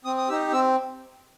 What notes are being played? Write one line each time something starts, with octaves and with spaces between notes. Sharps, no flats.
C4 D#6
D#6
D#4 G4 E6
C4 E6